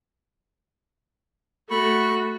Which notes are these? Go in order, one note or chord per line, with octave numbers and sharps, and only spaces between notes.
A3 F#4 B5 C#6